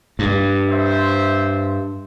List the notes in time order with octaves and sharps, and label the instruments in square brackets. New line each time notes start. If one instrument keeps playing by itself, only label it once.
[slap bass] G2
[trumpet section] C5 E5